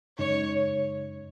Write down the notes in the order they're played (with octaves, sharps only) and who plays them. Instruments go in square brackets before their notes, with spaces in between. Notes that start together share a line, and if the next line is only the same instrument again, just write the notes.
[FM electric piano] F#2 C#3 G#3 D#4 [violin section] C#5